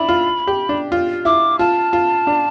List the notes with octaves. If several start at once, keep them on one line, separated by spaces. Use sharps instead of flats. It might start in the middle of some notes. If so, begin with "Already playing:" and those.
Already playing: D4 E4 B5
F4
G4
D4
F4
E4 D6
F4 A5
F4
D4